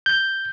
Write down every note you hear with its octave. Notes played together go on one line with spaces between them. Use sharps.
G6